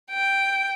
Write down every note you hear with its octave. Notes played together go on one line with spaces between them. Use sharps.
G5